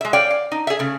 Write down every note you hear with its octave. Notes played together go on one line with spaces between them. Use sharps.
G#3 E5
C#5 D5 F5 G5
F5
D#4
G#4 E5
C#3 A3